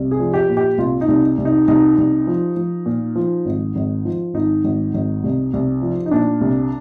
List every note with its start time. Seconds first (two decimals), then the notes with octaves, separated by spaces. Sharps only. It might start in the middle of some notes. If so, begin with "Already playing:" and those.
Already playing: C2
0.11 G#4
0.20 F3
0.34 G4
0.50 A#2
0.57 G4
0.78 C2 F4
1.01 D#4
1.08 C2
1.38 C2
1.45 D#4
1.68 C2 D#4
1.98 C2
2.27 F3
2.57 F3
2.86 A#2
3.15 F3
3.45 G#1
3.75 G#1
4.05 F3
4.34 G#1 D#4
4.64 G#1
4.94 G#1
5.24 C2
5.53 C2
5.82 F3
6.06 D#4
6.11 A#2 D4
6.41 C2